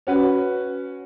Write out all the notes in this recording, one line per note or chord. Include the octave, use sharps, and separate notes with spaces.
C#4 F#4 B4